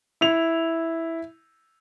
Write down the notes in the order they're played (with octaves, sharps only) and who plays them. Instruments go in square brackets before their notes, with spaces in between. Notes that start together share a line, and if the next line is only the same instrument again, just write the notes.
[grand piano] E4 F7